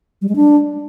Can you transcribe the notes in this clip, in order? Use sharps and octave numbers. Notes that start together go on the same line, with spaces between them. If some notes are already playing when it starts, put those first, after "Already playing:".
G3
G#3
D4